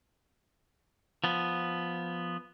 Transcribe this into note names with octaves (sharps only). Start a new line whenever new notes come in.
F3 B3